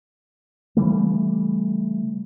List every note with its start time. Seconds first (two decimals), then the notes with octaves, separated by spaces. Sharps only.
0.77 C#3 E3 G3 A3